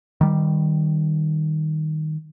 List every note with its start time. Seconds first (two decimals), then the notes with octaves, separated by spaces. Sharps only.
0.21 D#3 G3